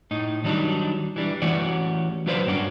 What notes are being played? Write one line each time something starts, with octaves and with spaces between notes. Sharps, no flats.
A2 D#4
D#3 F#3 G3 D4 D#4
E3 G3 D4
E3 A3 C#4 F#4 G4 D5
D3 F#3 F4 B4 C5 D5
G2 A#3 C#4 D4 F#4